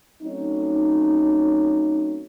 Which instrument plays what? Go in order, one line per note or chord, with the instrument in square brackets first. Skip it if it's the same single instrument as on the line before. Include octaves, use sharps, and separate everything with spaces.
[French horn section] F#3 A3 C4 C#4 D#4